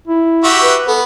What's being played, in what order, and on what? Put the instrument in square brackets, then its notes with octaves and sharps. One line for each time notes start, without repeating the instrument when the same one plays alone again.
[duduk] E4
[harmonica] F#4 G4 E5
[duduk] B4
[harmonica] B3 [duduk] A4